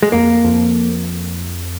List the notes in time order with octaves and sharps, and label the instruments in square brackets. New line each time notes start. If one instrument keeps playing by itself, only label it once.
[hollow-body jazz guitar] G#3
[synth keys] F2 [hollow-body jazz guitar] A#3
[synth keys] F2